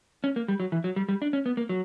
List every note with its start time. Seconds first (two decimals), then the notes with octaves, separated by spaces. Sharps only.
0.24 C#4
0.36 A#3
0.48 G3
0.60 F#3
0.72 E3
0.84 F#3
0.96 G3
1.09 G3
1.22 D4
1.33 C#4
1.46 B3
1.57 A#3
1.69 F#3